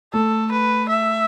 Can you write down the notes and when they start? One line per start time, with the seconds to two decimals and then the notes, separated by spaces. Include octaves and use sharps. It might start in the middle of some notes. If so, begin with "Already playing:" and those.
0.13 A3 A4
0.51 B4
0.89 E5